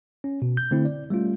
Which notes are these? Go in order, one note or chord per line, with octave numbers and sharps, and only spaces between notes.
C#4
B2
G6
D3 A3 C4 E4
D5
G3 A3 C#4 F4